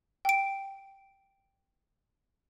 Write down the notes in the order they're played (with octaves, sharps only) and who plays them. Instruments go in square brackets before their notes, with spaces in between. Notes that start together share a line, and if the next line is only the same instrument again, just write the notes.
[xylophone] G5 D7